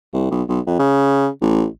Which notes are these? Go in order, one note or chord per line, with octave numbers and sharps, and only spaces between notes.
C2
B1
B1
F2
C#3
A1